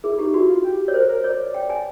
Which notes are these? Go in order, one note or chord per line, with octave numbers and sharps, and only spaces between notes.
E4 G#4
D#4 G4
E4 F#4
F4
G4
C#5
A#4 C5
A#4
C#5 D5
G5
G#5